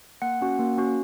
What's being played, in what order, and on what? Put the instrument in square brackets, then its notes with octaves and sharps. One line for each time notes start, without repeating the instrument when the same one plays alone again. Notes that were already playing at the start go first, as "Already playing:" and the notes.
[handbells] A#3 F#5
C#4 F#4
A#3
C#4 F#4